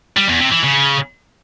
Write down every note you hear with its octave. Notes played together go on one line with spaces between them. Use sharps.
G3
E2
C3
E3
C#3